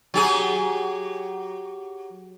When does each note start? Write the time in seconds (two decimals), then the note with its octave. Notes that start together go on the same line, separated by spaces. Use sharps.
0.14 F#3 G4 G#4